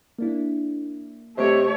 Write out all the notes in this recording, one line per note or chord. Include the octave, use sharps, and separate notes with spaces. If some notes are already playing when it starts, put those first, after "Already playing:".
A#3 D4 E4
C3 A3 C#5 D#5 C#7 D7